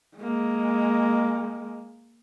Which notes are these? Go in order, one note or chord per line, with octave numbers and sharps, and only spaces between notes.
G#3 A#3